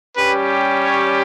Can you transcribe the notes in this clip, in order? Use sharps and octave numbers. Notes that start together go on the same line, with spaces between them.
G3 C#4 G4 B4
C#5